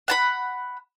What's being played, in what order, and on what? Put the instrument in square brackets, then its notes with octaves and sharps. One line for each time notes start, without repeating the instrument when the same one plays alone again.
[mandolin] F#5 A5 B5